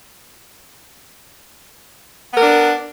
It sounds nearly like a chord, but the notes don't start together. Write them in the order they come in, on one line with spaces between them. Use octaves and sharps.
B3 A#4 D4